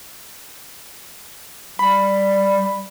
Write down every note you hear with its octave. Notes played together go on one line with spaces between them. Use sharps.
G3 B5